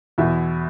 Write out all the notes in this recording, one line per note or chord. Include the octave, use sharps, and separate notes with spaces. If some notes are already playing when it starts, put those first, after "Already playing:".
E2 B2 E4